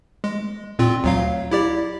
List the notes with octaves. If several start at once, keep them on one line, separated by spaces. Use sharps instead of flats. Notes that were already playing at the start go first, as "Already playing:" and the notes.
G#3
A#2 C4 F4
D2 F#3 F5
E4 G4 D5